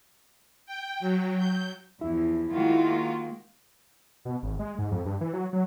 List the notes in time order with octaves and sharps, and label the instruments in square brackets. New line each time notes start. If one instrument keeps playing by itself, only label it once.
[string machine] G5
F#3
G6
[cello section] E2 F3 [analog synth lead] E4
[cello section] D#3 G#3 A#3 [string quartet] F4 F#4
[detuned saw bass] B2
G#1
G#3
G#2
F2
G2
E3
F#3
F#3